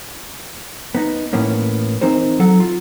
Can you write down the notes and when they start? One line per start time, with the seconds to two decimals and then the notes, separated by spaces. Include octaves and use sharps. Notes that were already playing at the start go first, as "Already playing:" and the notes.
0.95 B3 D#4
1.33 A2 E3 A#3 B3 C#4
2.01 E3 C4 D#4 A#4 C5
2.40 F#3 A4 F#5
2.60 F4